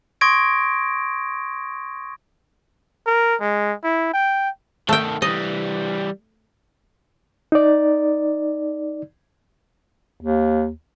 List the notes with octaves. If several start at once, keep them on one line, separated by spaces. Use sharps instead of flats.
C6 C#6 D#6 G#6 A#6 D7
A#4
G#3
E4
G5
D#3 A3 A4 G5
E3 G3 D#5
D#4 D5
D#2